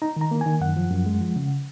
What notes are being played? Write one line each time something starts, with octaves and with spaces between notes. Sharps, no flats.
D#4 A#5
D#3 A#5
A#3
G#5
D#3
F#2 F#5
F3
F#2
G#3
F3
C#3